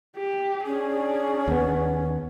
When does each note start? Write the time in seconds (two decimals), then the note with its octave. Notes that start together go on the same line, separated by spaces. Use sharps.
0.17 G4
0.66 C#4 D4 G#4
1.48 D#2 B3